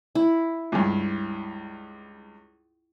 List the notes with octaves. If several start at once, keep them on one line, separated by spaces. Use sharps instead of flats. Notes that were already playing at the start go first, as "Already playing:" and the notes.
E4
C#2 G2